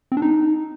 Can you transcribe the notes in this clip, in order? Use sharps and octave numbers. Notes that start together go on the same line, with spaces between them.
C4
D4
D#4